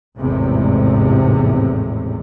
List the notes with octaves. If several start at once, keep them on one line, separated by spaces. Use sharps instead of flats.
G#1 E2 A2 C3